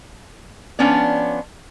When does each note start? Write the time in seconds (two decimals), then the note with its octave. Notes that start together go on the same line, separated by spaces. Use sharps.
0.79 F3 B3 C#4 D4 C#5 D5